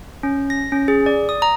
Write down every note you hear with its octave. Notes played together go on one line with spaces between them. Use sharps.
C#4
A#6
C#4
G#4
D5
D#6
A#5